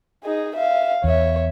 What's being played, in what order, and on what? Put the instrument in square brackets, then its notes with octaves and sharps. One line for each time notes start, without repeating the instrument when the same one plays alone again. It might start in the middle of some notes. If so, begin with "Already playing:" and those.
[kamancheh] D#4 G#4
E5 F5
[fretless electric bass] E2 [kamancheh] C#5 E5